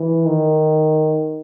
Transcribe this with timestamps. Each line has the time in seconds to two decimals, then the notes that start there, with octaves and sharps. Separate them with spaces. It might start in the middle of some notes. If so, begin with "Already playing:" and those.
Already playing: E3
0.26 D#3